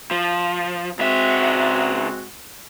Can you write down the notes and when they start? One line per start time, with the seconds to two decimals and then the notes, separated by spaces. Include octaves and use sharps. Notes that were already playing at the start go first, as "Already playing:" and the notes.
0.11 F3
0.99 C#2 G#3 C4 F#4 E5